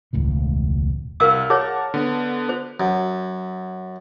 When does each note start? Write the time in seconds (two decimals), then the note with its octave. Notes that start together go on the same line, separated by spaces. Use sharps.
0.13 E1 C#2 A2 D#3
1.20 C2 A#4 F5 E6 F6
1.50 G#4 A#4 C#5 F#5 A5
1.94 D3 B3
2.49 C5
2.80 F#2